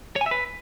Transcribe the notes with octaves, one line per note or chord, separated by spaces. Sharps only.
C#5
G#5
E5
B4